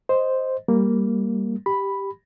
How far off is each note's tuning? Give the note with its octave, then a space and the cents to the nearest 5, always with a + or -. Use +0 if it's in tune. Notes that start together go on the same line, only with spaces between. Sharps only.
C5 +0 D#5 +0
G3 +5 A#3 -5
G4 +0 B5 +0